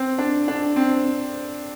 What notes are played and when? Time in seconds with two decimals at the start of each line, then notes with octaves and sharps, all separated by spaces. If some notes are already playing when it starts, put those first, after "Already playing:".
Already playing: C4
0.18 D4
0.48 D4
0.76 C4